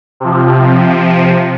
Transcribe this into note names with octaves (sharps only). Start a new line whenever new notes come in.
C3 F3